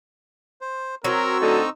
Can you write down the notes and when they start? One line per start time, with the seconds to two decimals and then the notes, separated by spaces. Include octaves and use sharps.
0.61 C5
1.04 F#3 C4 A#4 C#6 E6
1.41 A2 D3 D#4 A4